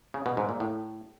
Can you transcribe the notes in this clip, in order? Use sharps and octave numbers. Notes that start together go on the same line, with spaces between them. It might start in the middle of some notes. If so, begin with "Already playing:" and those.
C#3
B2
G#2
A#2
A2